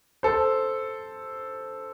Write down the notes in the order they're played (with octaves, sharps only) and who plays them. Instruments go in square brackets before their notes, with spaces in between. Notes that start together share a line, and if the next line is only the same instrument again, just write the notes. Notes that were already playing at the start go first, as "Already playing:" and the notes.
[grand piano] A4 C5